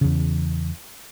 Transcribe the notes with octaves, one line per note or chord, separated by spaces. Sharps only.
E2 C#3